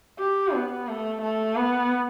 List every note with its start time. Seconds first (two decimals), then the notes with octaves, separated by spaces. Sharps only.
0.19 G4
0.54 B3
0.88 A3
1.21 A3
1.56 B3